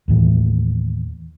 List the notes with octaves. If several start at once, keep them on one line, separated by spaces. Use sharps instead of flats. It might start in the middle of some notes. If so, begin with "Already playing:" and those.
D#2 A2 E3